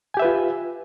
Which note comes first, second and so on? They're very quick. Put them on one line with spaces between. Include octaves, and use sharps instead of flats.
G#5 G4 E5 B4 F4